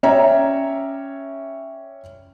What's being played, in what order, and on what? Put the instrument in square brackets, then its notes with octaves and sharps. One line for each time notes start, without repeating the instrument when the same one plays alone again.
[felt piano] C#4 C#5 D5 E5 G5 A#5